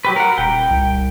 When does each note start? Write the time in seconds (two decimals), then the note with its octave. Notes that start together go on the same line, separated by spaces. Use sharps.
0.05 F#3 G4 B4
0.16 A#4 F#5
0.38 D#1 G5
0.70 C2